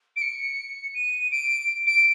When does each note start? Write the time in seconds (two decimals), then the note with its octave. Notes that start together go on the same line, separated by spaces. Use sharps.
0.16 D7
0.21 C#7
0.94 D#7
1.31 D7
1.86 D7